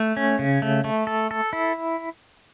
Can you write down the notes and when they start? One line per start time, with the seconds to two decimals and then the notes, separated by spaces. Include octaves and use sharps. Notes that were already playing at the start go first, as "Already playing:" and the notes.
Already playing: A3
0.17 C#4
0.39 C#3
0.62 A3
0.84 A3
1.07 A4
1.31 A4
1.53 E4